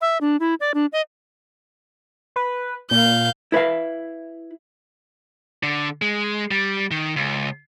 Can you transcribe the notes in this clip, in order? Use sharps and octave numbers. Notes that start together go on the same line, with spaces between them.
E5
D4
E4
D5
D4
D#5
B4
A#2 F5 G6
E4 B4 E5 F5
D3
G#3
G3
D#3
C#2